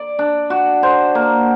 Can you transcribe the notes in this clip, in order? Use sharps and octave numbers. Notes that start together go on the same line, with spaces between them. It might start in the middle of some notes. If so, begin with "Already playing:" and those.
Already playing: D5
D4
F#4
C5
A#3